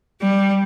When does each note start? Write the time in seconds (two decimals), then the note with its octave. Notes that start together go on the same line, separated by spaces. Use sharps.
0.20 G3